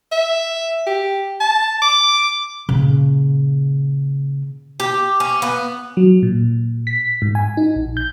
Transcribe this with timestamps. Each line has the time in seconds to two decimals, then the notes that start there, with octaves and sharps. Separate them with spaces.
0.12 E5
0.87 G4
1.40 A5
1.82 D6
2.69 A#2 C#3
4.80 G4
5.20 C#4
5.42 B3
5.97 F#3
6.23 A#2
6.87 B6
7.22 G#2
7.35 G#5
7.57 D#4
7.76 A#1
7.97 G6